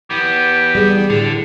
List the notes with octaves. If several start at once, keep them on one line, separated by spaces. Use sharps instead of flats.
E3 B3 G4
G3 G#4
A2 D3